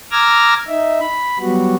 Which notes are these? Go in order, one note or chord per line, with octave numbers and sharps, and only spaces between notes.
A#5 D6 E6 F6 G#6 A#6
D#4 E5
B5
F#3 G3 B3 F#4